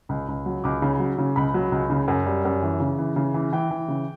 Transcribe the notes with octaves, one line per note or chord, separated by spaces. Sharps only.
C#2
C#2
F#3
C#2 D6
C#3
F#3
C#3
C#2 B5
F#3
C#2
C#3
F#2
G3
F#2
E3
C#3
E3
C#3
E3
E3 G5
E3
C#3